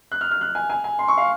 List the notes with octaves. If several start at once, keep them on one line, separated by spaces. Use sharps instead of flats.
F#6
F6
F6
F#6
G#5
G#5
G#5
C6
C#6
F5